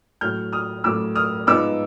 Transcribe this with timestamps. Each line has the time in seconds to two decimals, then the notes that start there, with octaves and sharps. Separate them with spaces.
0.21 A2 F#3 A3 F6 G6
0.53 D#6 F6
0.84 A2 F#3 A3 D6 E6
1.15 D#6 F6
1.47 G#2 F3 G#3 B3 D#4 D6 E6